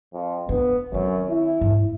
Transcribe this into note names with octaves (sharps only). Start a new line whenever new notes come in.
F2
B3 D4
F#2 D#3 C4
E4
G#2